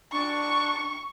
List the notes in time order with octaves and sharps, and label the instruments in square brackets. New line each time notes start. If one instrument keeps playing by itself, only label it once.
[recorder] D4 [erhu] C#6